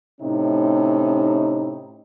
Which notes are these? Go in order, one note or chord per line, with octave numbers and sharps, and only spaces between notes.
A2 C3 C#4 D#4